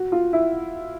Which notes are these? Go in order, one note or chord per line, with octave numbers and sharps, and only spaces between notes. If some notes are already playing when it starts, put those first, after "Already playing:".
Already playing: F#4
F4
E4